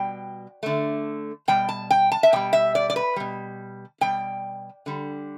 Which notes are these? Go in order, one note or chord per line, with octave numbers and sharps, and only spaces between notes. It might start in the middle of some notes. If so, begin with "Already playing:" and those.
Already playing: B2 G3 G5
D3 A3
B2 G3 G5
A5
G5
A5
E5
B2 G3 G5
E5
D5
D5
B4
B2 G3
B2 G3 G5
D3 G3